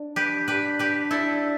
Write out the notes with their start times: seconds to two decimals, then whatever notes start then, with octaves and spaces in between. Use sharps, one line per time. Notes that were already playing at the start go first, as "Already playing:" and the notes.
Already playing: D4
0.16 G4 B4
0.48 G4 B4
0.79 G4 B4
1.11 E4 A4